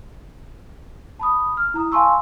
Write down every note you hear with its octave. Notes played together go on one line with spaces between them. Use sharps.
A5 B5 D#6
F6
E4 A#5 D#6
F5 G#5 A5 C6 C#6 E6